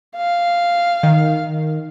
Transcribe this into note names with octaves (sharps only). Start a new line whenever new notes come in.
F5
D#3